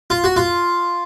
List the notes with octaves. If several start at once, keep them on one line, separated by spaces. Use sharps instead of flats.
F4
F#4
F4